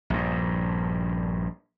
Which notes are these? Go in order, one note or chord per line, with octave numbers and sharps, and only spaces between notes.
A#1 G2